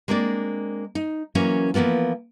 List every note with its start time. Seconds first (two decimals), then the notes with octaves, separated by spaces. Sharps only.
0.08 G#3 A#3 C4 D4 D5
0.95 D#4
1.35 E3 F#3 A#3 C#4 A#4
1.74 E3 F3 A#3 B3 F4